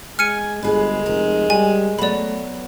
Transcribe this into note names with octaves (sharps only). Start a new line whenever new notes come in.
G#3 G#5 F6 C#7 D#7
G1 G#3 G#4 B4
F1 A#4
G3 G#5
F#3 A3 B3 D5 B5